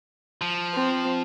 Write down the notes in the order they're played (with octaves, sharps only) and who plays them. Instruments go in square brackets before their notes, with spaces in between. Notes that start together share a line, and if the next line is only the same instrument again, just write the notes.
[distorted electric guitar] F3
[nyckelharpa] C4